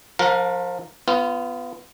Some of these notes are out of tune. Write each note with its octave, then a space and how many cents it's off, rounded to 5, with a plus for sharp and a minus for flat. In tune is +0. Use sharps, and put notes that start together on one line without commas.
F3 +25 A#4 +0 F#5 -40
B3 +15 F4 -20